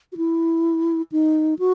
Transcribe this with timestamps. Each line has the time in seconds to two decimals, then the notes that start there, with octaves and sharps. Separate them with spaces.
0.13 F#4
0.17 E4
1.12 D#4
1.59 F#4